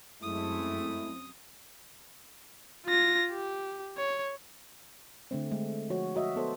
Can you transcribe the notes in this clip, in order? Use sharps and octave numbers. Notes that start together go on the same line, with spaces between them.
F#2 G#3 A3 C4 E4 D#6
F4 A#6
G4
C#5
D3 A3 C4
G#3 A3
F3 F#4 C#5
F#4 D#5 E5
B3 A4 C5